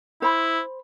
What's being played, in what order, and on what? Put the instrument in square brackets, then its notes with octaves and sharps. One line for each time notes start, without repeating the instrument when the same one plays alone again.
[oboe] E4 [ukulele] C5 B5